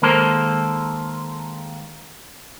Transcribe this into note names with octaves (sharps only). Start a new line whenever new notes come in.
D#3 G#3 A#3 A4 A#4 C5